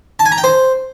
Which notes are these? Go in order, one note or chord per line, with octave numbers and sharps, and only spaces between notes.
A5
G#5
A#5
G5
C5